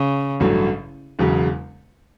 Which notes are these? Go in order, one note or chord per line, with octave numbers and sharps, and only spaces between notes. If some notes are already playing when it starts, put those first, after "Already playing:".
Already playing: C#3
A1 G2 F#3 A3
E1 E2 C#3 F#3